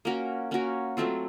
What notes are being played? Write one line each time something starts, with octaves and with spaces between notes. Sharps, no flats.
A#3 C#4 F#4 A#4
A#3 C#4 F#4 A#4
F#3 A3 C4 F4